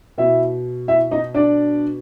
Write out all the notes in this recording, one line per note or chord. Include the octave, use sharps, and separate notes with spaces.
B2 E4 E5
E4 E5
D#4 D#5
D4 D5